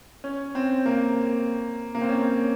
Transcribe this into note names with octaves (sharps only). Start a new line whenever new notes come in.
C#4
C4
A#3
A#3
C4
C#4